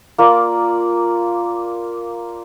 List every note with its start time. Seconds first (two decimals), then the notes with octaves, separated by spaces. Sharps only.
0.18 A#3 F4 D5